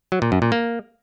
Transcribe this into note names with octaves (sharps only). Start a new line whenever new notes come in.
F#3
A#2
F#2
A#2
A#3